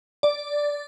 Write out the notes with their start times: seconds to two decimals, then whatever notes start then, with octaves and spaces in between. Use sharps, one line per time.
0.23 D5